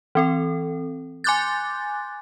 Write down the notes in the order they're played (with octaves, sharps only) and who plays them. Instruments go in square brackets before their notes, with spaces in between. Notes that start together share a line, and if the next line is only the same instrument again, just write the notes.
[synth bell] E3 C4 A4
G#5 C6 D6 F#6 G6 A6